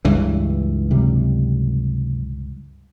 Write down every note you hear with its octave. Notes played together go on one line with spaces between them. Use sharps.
C#2 G2 E3
C3 F#3 G3